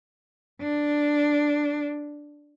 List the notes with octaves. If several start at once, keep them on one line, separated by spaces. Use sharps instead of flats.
D4